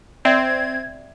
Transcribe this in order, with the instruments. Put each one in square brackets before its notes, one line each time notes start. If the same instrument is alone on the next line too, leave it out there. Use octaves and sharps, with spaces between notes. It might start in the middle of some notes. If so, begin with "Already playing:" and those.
[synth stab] C4 [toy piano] D5 E5 G5 [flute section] G#6